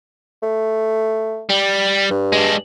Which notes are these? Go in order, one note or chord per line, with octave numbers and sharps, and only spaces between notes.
A3
G3
G2
G#3 D4